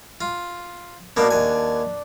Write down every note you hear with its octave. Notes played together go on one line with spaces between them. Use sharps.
F4
B2 A#3 B3 D4 D5
D#2 G#5